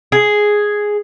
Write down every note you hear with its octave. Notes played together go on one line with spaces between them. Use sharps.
G#4